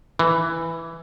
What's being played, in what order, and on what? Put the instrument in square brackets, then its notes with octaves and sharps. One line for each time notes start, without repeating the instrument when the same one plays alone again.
[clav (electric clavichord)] E3